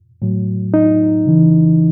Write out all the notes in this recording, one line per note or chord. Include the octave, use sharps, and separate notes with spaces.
A2 F#3
D#4
C#3 E3